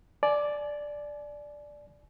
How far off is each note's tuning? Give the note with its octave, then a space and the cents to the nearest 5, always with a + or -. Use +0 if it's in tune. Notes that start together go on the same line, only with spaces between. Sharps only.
D5 +0 G#5 +40